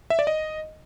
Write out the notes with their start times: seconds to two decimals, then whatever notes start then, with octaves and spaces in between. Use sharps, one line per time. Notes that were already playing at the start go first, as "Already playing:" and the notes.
0.10 E5
0.19 D5
0.27 D#5